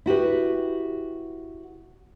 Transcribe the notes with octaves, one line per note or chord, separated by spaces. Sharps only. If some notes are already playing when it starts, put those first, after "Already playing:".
E4 F#4 G4 B4